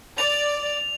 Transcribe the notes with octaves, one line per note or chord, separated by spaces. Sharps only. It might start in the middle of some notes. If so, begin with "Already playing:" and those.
D5 F7